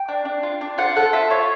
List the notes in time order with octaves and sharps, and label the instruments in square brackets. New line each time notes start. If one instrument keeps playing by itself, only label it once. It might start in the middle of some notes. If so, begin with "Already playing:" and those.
Already playing: [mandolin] G5
D4
D4
F4
D4
F4 F#5
A4 F#5
F4 E5
F4 C#5